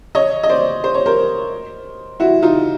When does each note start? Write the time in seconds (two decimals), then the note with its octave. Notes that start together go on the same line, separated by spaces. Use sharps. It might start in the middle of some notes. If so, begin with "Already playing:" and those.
0.15 C#5 D#5
0.43 D#5
0.49 C5 D5
0.84 C5
0.94 C#5
1.06 A#4 C5
2.20 E4 F#4
2.43 D#4 F4